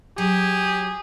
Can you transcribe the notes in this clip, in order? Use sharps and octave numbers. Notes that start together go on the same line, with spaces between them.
F#3 G4 G#4